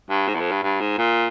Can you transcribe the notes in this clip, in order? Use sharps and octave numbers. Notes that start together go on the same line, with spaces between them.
G2
G#2
E2
F2
G2
G2
G#2
A#2